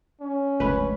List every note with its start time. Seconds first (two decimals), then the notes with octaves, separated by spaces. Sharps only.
0.21 C#4
0.60 F1 C#2 G2 B4